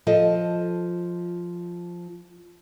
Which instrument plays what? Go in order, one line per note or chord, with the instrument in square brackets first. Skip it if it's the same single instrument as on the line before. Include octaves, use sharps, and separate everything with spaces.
[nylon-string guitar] F3 A4 D#5